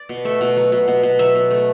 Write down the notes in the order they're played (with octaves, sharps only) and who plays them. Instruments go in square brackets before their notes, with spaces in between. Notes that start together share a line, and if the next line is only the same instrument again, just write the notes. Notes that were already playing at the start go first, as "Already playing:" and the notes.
Already playing: [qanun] D5
B2
A3 E5
B2
F#3
B2
B2
B2
F#3 E5
B2
A3